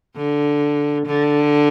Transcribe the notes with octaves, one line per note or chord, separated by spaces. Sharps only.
D3
D3